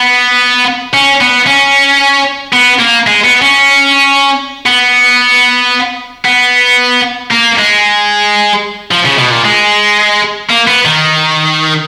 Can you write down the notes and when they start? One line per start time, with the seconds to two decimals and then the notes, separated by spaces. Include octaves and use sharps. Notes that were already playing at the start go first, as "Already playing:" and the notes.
Already playing: B3
0.94 C#4
1.21 B3
1.47 C#4
2.53 B3
2.79 A#3
3.07 G#3
3.24 B3
3.42 C#4
4.66 B3
6.25 B3
7.31 A#3
7.59 G#3
8.91 F3
9.05 C#3
9.18 B2
9.31 A#2
9.45 G#3
10.50 A#3
10.68 B3
10.85 D#3